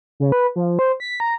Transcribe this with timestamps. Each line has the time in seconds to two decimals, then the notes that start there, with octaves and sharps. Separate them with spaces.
0.20 C#3
0.32 B4
0.56 F3
0.79 C5
1.00 B6
1.20 A#5